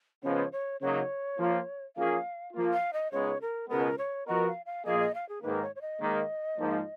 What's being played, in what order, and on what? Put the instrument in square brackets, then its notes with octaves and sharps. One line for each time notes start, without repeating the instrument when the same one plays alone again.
[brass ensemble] C#3 F3 G#3 B3 [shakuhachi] C#5
[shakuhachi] C#5
[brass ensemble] C#3 F#3 A#3 D#4 [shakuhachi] C#5
[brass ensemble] F3 A#3 F4
[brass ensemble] F3 A#3 C#4 G#4 [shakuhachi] F5
[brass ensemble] F3 A#3 F4
[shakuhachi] F5
D#5
[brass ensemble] C#2 C#3 G#3 B3 D#4 [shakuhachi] C#5
[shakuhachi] A#4
[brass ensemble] C#2 B2 G#3 B3 [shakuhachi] A#4
[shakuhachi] C#5
[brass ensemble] F3 B3 F#4 A#4 [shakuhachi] D#5
[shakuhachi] F5
F5
[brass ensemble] A#2 F3 A#3 F4 G#4 [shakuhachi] D#5
[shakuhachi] D#5
F5
G#4
[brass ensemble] G#2 D#3 A#3 [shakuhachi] B4
[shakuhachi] C#5
C#5
D#5
[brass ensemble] G#2 D#3 A#3 D#4
G#2 F3 A#3